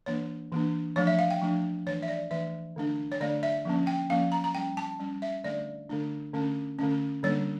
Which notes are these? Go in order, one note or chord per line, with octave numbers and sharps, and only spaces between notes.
E3 A#3 D4 C#5
E3 A#3 D4
F3 A3 D4 C#5
E5
F5
G5
F3 A3 D4
E3 A3 D4 C#5
E5
D5
E3 A3 D4 E5
D3 A3 D4
C#5
D3 A3 D4 D5
E5
F3 A#3 C#4
G5
F3 A#3 C#4 F5
A#5
A#5
G3 C#4 G5
A5
G3 C#4
E5
D3 A3 D4 D5
D3 A3 D4
D3 A3 C#4
D3 A3 C#4
D3 G3 A#3 D4 C#5